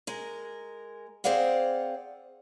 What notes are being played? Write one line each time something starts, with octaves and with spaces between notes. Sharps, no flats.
G#3 A#4
C4 G#4 C5 D5 F5 F#5